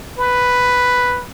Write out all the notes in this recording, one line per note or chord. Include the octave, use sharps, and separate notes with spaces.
B4